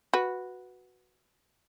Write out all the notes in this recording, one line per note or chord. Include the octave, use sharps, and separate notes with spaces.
F#4 B4